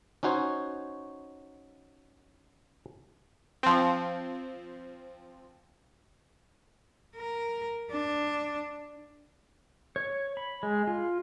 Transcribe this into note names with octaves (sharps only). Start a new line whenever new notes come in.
C#4 D#4 F#4 C5 C#5
F3 C4
A#4
D4
C#5
B5
G#3
F4